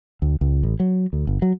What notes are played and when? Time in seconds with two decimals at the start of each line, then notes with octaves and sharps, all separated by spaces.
0.22 D2
0.41 C#2
0.63 A1
0.80 F#3
1.13 D2
1.27 G1
1.42 F#3